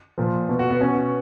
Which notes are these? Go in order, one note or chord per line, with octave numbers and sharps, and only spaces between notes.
A#2 F3
B2
F#4
B3
B2 C#4